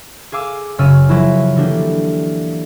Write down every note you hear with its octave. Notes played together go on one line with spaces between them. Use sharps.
G#4 F5 D6 E6
F#1 C#3 E6 F6 A6 D#7
F3 F#3 E4
D3 E3 A#3 D4 G4